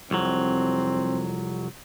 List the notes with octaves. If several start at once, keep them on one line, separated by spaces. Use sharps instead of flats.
C2 F2 F#3 C4